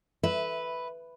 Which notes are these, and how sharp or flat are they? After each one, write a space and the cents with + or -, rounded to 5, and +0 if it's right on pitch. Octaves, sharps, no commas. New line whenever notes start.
B4 +5 E5 -10